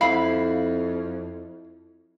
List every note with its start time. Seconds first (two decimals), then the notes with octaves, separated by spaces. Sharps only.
0.01 F2 E4 F5 B5